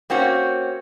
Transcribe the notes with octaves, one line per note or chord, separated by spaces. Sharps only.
A#3 C4 C#4 F#4